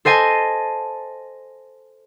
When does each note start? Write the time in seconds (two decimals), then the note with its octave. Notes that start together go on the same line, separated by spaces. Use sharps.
0.05 A4 C5 D#5 G#5 A5